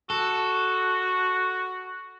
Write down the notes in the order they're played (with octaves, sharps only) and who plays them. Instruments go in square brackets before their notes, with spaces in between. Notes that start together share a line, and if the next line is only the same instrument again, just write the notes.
[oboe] F#4 [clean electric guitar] A4